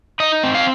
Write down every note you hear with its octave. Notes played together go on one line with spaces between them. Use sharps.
D#4 D#5
C4
F5